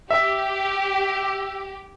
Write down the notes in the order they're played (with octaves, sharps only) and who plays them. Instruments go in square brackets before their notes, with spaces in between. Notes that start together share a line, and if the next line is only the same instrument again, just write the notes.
[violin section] G4 [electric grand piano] E5